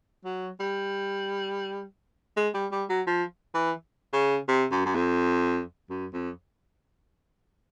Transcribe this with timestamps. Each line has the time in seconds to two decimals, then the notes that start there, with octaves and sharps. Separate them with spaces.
0.25 F#3
0.60 G3
2.37 G#3
2.54 G3
2.72 G3
2.89 F#3
3.07 F3
3.54 E3
4.13 C#3
4.48 C3
4.72 F#2
4.86 F#2
4.95 F2
5.90 F#2
6.13 F2